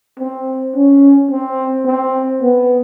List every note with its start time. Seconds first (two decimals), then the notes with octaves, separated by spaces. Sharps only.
0.19 C4
0.75 C#4
1.31 C4
1.86 C4
2.42 B3